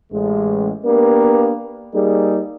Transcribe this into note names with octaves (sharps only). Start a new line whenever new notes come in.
A1 G#3
A#3 B3 D4 G4 A#4 B4
G3 A#3 D#4 G#4